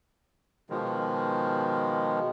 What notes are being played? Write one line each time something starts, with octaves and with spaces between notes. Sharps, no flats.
B2 D#3 F3 G#3